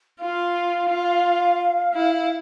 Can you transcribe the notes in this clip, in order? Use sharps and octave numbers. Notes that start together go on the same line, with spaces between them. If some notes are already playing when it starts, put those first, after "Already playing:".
F4 F5
F4
E4